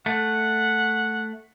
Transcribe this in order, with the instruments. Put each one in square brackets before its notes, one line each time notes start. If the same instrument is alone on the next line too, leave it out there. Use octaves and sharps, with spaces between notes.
[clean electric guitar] A3 [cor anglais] F#5